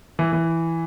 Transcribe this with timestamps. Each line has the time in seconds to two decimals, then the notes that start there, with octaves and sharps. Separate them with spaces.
0.19 E3
0.33 E3